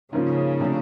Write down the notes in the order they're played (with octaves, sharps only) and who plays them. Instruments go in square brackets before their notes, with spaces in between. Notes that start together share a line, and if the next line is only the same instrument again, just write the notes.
[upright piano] G#2 F3 A#3 C#4 F4 [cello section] C#3
[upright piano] C3 F3 A3 D4